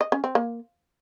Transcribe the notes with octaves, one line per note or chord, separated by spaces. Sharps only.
D#5
C#4
C4
A#3